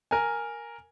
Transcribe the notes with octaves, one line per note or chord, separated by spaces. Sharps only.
A#4 G#5